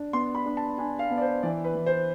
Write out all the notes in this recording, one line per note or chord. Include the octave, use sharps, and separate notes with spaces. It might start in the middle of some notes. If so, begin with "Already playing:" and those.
Already playing: D4
B3 C6
B5
D4
A5
D4 G#5
F5
B3
D5
C5
E3 D5
B4
E3
C5